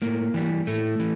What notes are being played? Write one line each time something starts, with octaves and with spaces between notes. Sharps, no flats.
A2 A#3
E3 G3
A2 A3
E3